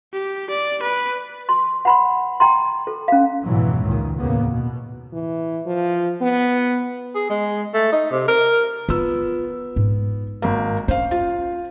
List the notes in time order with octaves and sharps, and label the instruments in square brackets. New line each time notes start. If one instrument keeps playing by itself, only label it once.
[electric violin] G4
D5
B4
[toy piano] C6
F#5 B5 C6
G5 A#5 C6
A4
C#4 F5
[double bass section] F2 G#2 B2 E3 F#3
C#2 A#2 D#3
D#2 A2 C#3 A#3 B3
B2
[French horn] E3
F3
B3
[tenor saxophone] G#4
G#3
A3
D#4
C3
A#4
[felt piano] B3 E6 [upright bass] F4
[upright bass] G#2
[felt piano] G#1 A#3
[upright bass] C#4 [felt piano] C5 F5
[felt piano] F4